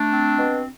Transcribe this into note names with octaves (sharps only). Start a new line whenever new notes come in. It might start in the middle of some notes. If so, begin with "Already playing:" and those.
Already playing: A3 D4
C4
B2